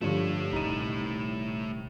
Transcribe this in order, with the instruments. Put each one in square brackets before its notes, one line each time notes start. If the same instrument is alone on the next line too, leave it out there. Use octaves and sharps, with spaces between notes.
[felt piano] G2 D3 F3 [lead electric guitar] A3 C#5
[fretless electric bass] D#1 C2 [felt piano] D#4 D#7